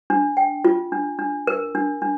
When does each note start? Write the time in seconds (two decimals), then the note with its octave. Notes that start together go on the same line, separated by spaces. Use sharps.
0.10 D4
0.37 G5
0.65 F4
0.92 D4
1.19 D4
1.47 A#4
1.75 D4
2.02 D4